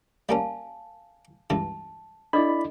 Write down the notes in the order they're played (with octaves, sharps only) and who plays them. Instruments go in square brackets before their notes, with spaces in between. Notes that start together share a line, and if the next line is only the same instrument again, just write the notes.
[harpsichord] G3 A#3 C#4 [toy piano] F5 G#5 A5
[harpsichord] C#2 G2 E3 [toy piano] A5
[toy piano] D4 A4 D#5 [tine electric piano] E4 D5 B5